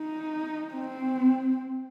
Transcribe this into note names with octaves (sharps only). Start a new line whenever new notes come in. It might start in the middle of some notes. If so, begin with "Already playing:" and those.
Already playing: D#4
C4